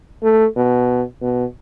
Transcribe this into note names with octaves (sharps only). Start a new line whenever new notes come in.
A3
B2
B2